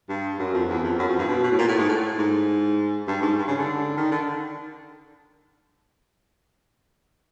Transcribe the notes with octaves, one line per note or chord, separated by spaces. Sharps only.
G2
F#2
F2
E2
F2
F#2
F2
G2
B2
B2
A2
A#2
A2
G#2
A2
G#2
G2
G#2
G2
C#3
D3
D#3
D3